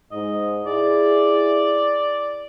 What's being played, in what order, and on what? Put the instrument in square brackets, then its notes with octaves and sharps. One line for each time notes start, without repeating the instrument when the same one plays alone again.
[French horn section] G#2 [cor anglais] D#5
[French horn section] E4 G#4 [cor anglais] D5